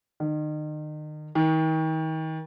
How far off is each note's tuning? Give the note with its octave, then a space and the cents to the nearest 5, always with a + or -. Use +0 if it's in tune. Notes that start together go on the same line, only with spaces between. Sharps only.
D#3 -35
D#3 +35